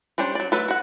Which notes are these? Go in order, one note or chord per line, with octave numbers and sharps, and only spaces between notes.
G3 C#4 D4 C5
F#3 D5
F#3 A3 A4 B4
F#4 F#5